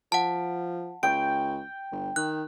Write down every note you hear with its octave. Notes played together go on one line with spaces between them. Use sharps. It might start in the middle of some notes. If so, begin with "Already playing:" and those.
F3 F#5 A5
C#2 G5 D7
G1
D#3 F#6